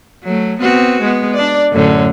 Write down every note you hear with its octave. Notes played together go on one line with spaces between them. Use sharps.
F#3 A3
B3 C4 F#4
G#3 B3
D4 D5
F#2 A2 D3